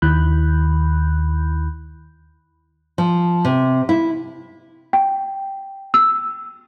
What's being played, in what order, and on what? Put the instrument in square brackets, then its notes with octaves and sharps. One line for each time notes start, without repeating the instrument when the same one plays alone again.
[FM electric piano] D#2 D#3 E4 B5 F#6 G6
[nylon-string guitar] F3
C3
E4
[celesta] G5
E6